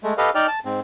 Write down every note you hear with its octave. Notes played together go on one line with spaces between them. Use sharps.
G#3 A3
G4 A4 B4 D#5 F5
D#4 D5 G5 F6
A5
G#2 C4